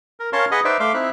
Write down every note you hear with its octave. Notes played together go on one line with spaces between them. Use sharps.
A#4
C#4 A#4 C#5 F5 A5 C6
G#4 B4 D#5 F#5
D#4 B4 C5 D5 E5
A3 E5 F5 C6 D6
C4 D#4 E4 E5 F#6